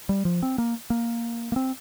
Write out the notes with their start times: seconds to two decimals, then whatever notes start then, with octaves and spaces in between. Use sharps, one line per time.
0.09 G3
0.25 F3
0.43 C4
0.58 A#3
0.90 A#3
1.52 A#3
1.56 C4